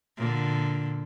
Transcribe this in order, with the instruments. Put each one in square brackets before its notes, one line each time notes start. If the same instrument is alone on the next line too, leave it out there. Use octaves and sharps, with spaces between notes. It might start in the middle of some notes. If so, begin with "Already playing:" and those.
[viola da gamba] A#2 D3